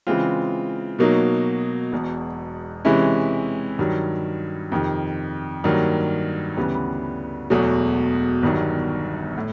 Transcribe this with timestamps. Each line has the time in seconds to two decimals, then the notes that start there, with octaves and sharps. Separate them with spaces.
0.07 C#3 E3 G#3 C4 F4
0.99 B2 F#3 A#3 D#4
1.92 E1 E2 B2
2.85 C3 E3 G#3 C#4 E4
3.79 G2 D#3 F#3
4.72 F2 C3 D#3
5.64 G2 D#3 F#3 A#3
6.57 D2 C#3 E3 G3 B3
7.50 E1 E2 B2 F#3 A3
8.43 G1 G2 D#3 F#3
9.37 A2